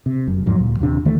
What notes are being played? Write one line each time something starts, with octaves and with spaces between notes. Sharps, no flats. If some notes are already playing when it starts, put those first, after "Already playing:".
C3
F1 F#2
D#2 G#2 F3 F#3
D2 A#2
D#1 D#2 C3 D4
D2 D#3 E3 A3